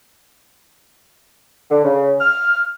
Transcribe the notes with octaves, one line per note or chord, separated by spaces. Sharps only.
D3
C#3
F6